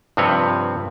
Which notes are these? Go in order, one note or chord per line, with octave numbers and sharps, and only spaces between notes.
G2 C3 F3 C4 B4 C#5